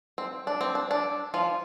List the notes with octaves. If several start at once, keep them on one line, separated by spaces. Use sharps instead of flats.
C4
D4
C4
D4
D4
F3 F4